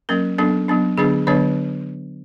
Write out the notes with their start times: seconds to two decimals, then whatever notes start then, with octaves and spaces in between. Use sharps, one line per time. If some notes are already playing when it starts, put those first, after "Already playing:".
0.09 F#3 A#3 C#4 A#4
0.38 F#3 B3 D4 A4
0.68 F#3 B3 D4
0.98 D3 F#3 B3 D4 G#4
1.27 D3 F#3 B3 D4 C#5